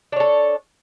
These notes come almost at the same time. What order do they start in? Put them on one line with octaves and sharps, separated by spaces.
D4 C#5 A4